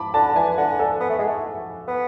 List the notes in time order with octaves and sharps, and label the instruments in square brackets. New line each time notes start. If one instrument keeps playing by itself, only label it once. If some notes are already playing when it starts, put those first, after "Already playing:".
Already playing: [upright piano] A5 B5 D6
[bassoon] D3 [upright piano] A5
[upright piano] A5
[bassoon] E3 [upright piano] G#5
[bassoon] D3 [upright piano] F#5
[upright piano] A4
[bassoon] B3
A3
G#3
A3
B3